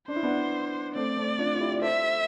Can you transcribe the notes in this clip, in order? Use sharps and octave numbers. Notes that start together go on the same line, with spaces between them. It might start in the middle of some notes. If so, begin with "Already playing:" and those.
D4 C5
E4
B3 D4
A3 C4 D5
A3 C4
D4 F4
F4
E4 G4
D5
A4 C5 E5